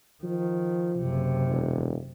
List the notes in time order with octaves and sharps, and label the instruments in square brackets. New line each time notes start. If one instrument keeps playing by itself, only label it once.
[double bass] D#3 [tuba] F3
[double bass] F#1 C3
[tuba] E1